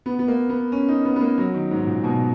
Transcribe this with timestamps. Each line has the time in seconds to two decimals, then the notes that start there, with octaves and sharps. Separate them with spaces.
0.06 B3
0.19 B3
0.28 A#3
0.49 B3
0.72 C#4
0.88 D#4
1.05 B3
1.16 B3
1.21 A#3
1.38 F#3
1.54 D#3
1.71 G#2
1.87 A#2
2.04 B2